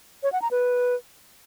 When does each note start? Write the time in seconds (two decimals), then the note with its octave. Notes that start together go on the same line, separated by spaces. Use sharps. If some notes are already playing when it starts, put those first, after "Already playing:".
0.23 C#5
0.32 F#5
0.42 A#5
0.51 B4